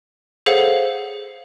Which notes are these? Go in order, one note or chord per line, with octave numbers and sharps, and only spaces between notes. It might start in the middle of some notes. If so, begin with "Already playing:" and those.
G#4 A4 C5 C#5 F5 F#5